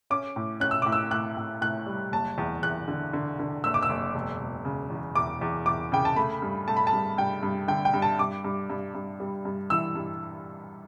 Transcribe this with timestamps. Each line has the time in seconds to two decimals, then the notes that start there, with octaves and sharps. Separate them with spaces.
0.10 C#4 D6
0.36 A2
0.60 C#4 F#6
0.71 E6
0.82 A2 D6
0.92 E6
1.11 A2 F#6
1.37 A2
1.61 A2 F#6
1.87 G3
2.12 F#1 A5
2.38 E2
2.63 E2 F#6
2.88 D3
3.13 D3
3.39 D3
3.64 F#1 E6
3.74 D6
3.83 E6
3.89 F#1
4.14 E1
4.40 E1
4.65 C#3
4.90 E2
5.15 E2 D6
5.41 E2
5.66 E2 D6
5.92 C#3 G5
6.05 A5
6.16 A3 B5
6.42 G2
6.68 A3 A5
6.77 B5
6.87 A5
6.93 G2
7.17 G2 G5
7.43 G2
7.68 D3 G5
7.85 G5
7.94 G2
8.02 A5
8.19 G2 D6
8.45 G2
8.70 G2
8.95 G2
9.20 G3
9.45 G2
9.70 E3 E6
9.95 G2